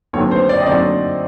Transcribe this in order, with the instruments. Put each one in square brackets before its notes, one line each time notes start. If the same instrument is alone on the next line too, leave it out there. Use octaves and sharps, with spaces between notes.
[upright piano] D#2 D3 F#3 A3 C4 C#5
C5
D5
D#5
D#2 D3 F#3 A3 C4 D5